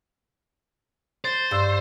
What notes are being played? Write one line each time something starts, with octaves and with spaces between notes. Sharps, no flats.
C5 A6
G2 E6